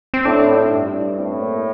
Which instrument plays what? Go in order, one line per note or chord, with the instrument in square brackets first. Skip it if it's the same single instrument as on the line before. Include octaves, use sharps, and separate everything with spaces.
[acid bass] C4
[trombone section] A2 [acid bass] D4
[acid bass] E4
[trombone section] G2
[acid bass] D4
[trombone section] A2 [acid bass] C4
[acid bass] A#3